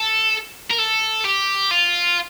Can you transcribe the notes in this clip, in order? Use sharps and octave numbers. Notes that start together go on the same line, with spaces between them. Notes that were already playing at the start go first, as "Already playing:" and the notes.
Already playing: A4
A#4
A4
G4
F4